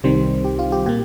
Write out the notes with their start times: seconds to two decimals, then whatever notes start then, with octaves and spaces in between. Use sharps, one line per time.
0.04 C2 C3 D#3 G3 C4 C5
0.45 G4
0.59 F4
0.72 G4
0.86 A#2 A#3 G4